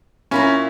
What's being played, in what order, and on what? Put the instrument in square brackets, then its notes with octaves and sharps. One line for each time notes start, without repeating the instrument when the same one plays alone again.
[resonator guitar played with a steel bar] A#2 A#3 E4 [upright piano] C#4